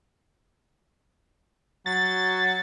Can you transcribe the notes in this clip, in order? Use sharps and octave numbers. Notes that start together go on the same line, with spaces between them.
F#3 A6